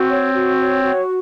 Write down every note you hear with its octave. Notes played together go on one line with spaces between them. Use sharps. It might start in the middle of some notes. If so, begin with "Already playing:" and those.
Already playing: C4 F#4
C#5
F#4
C#5
F#4